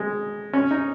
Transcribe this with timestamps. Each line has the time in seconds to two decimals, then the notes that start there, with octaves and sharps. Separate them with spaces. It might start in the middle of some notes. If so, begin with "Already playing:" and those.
Already playing: G#3
0.53 C#4
0.71 D#4